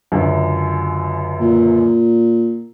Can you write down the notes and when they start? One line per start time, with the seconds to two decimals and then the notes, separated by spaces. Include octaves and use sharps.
0.12 C#2 F#2 D3
1.41 A#2